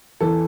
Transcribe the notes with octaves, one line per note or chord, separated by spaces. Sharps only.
E2 E3 A4